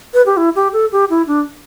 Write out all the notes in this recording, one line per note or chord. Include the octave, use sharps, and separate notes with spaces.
B4
G4
E4
G4
A4
G4
E4
D4